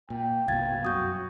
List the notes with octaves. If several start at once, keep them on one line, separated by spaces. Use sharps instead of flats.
A#2 G5
C2 G2 B2 F5 G#6 A6
F#2 F#4 D#6 G6